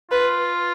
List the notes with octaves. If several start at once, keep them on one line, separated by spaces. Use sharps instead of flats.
F4 B4